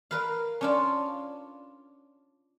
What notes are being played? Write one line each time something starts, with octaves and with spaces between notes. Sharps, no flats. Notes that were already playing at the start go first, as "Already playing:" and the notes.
A#4 B4 F5
C#4 D4 F4